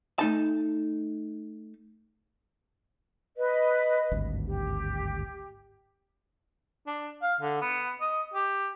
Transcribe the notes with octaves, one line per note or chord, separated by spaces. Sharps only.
A3 D#4 A5
B4 D#5
G#1 D2 G2
G4
D4
F5
D3
B3
D#5
G4